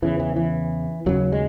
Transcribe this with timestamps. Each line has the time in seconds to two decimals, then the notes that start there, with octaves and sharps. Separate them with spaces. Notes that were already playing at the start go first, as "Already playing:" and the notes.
0.02 E2 C#3 E3
0.20 E3
0.36 E3
1.06 D#2 C#3 F#3
1.32 G#3